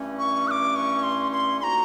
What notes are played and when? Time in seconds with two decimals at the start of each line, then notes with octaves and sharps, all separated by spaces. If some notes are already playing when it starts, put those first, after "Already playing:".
Already playing: G2 E3 A3 C#4
0.19 C#6
0.48 F#6
0.51 D6
0.76 C#6
1.03 C6
1.32 C6
1.60 D3 F3 A#3 D#4 F#4 A#5 C6